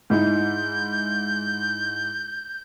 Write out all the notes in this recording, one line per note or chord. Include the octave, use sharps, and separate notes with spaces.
G#2 D#4 E4 G6